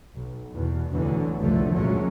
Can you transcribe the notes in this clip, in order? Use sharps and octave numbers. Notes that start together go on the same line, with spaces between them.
B1
E2 B2
D2 B2 D3 E3 F#3
F1 C2 G2 D3 F3 A3
D2 A#2 F#3 G#3 C#4